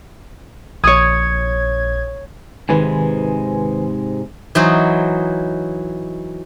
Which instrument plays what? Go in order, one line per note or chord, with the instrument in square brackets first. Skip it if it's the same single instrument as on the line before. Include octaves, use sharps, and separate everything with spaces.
[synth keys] A#1 G#6 [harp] C#5 D#6
[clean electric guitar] G#2 C3 G#3 [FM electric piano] D#3 B4 G#5
[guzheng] E3 F#3 D#4 C5